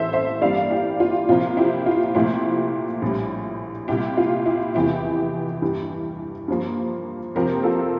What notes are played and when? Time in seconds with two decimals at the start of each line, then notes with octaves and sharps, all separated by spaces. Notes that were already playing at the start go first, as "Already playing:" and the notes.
Already playing: A1 A2 E3 A4 C5 E5
0.13 C5 E5
0.41 G2 E3 G3 A#3 D5 F5
0.70 E4 G4
1.00 F4
1.29 C2 A#2 F3 A#3 F4
1.57 E4 G4
1.86 F4
2.15 C2 A#2 F3 A3 E4 G4
3.02 A#1 A2 G3
3.88 C2 A#2 G3 E4 G4
4.17 F4
4.46 E4 G4
4.75 F1 E2 E3 E4 G4
5.62 G2 E3 G3
6.48 G2 F3 A#3
7.35 F2 C3 F3 A#3 G4 A#4
7.64 F4 A4